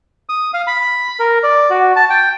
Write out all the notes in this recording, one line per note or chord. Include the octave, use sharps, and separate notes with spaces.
D#6
F5
B5
A#4
D5
F#4
A5
G5